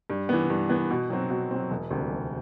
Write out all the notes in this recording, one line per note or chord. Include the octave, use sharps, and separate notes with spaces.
G2
E3 B3
G2
E3 B3
B2
F#3 C4
B2
F#3 C4
E1
D2 C3 G3
E1